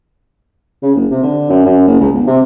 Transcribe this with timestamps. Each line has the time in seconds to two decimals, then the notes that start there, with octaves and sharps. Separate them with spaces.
0.82 C#3
0.95 F#1
1.11 C3
1.23 D3
1.49 F#2
1.66 F#2
1.87 F#1
2.00 C#2
2.14 G1
2.27 C3